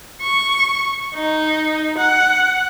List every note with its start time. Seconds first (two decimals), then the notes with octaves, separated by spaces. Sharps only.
0.22 C#6
1.15 D#4
1.98 F#5